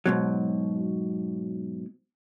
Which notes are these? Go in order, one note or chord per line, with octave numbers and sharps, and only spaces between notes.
G#2 B2 F#3